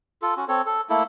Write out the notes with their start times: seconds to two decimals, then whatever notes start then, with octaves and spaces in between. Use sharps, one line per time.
0.22 F4 A4
0.37 C#4 F#4
0.48 C4 A4 C#5
0.66 A4
0.90 A3 A#3 E4 A4